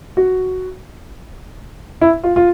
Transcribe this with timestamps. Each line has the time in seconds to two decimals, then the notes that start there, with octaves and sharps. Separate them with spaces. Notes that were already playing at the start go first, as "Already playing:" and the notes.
0.17 F#4
2.01 E4
2.23 F4
2.36 F4